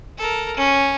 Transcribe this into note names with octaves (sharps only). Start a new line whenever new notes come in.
A4 A#4
C#4